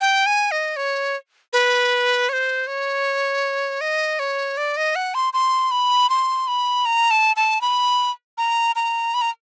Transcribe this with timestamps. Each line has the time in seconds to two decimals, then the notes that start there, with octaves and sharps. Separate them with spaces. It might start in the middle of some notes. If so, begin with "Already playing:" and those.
0.01 G5
0.26 G#5
0.51 D#5
0.76 C#5
1.53 B4
2.29 C#5
2.33 C5
2.67 C#5
3.81 D#5
4.19 C#5
4.57 D5
4.77 D#5
4.96 F#5
5.14 C6
5.33 C6
5.71 B5
6.10 C6
6.48 B5
6.85 A#5
7.11 A5
7.36 A5
7.61 B5
8.38 A#5
8.76 A#5
9.14 B5
9.21 A#5